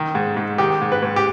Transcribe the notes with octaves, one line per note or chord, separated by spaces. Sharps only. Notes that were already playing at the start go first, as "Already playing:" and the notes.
Already playing: D#3
G#2
G#2
D#3 G4
G#2
B4
G#2
G4